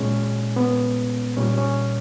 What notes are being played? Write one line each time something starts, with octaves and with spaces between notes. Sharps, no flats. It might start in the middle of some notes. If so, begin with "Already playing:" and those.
Already playing: A#2 G#3 C#4
B3
A#2 G3 C#4
C#4